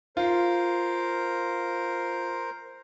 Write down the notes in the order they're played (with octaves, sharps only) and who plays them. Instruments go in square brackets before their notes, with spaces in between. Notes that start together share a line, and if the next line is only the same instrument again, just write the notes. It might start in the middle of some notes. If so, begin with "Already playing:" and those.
[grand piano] F4 [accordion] A#4 C5